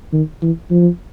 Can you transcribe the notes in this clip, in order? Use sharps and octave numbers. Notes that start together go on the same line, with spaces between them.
D#3
E3
F3